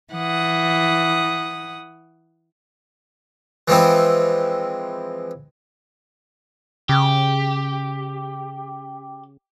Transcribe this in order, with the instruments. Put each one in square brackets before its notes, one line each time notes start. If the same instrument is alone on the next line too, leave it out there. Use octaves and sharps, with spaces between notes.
[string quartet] E3 F#5 D#6
[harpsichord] E3 F3 G#3 C4 E4
[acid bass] C#3 [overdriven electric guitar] G4